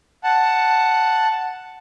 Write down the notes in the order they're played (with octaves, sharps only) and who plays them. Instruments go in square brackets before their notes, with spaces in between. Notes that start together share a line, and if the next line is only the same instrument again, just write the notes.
[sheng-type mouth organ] F#5 A5